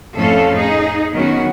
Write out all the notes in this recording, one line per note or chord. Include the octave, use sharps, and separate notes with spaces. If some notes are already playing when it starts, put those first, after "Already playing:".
F2 A2 C#4 A4 F5
D#4 G#4
D#3 F#3 B3 C#4 F#4